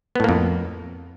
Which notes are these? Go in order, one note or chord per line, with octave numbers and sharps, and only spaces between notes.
F2 A2 A#3 B3